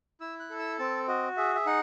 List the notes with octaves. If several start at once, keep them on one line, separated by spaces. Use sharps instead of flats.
E4 E6
F#6
A4
E6
C4 A5
F#4 D#5
G#4 E5
E5
D#4 F#5